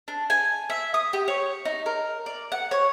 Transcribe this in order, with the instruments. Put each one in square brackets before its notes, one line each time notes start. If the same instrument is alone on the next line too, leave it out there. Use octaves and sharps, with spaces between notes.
[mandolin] D4
G#5
E5
D#6
G4
C#5
D#4
A#4
D5
F#5
C#5